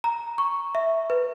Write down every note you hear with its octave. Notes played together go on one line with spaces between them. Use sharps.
A#5
C#6
E5
B4